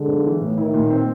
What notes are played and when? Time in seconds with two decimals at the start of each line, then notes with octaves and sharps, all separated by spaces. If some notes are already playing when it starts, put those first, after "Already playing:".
Already playing: D3 G#3
0.08 B1
0.26 E3
0.41 A2
0.57 D#3 E4
0.74 A#2
0.90 C4